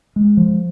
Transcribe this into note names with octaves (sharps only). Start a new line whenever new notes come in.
G#3
F3